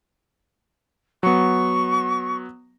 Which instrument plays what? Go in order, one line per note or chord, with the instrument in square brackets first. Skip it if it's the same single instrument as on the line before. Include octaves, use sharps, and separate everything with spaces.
[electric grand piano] F#3 B3 [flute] C#6